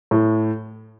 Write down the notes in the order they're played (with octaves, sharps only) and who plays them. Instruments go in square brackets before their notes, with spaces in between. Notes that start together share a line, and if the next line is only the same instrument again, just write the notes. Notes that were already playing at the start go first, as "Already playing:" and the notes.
[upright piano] A2